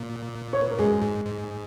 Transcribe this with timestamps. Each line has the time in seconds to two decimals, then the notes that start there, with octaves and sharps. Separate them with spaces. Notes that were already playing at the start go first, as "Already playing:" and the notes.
Already playing: A#2 A#3
0.53 C#5
0.62 B4
0.71 A#4
0.79 F#2 G#3 G#4
1.02 G#2
1.25 G#2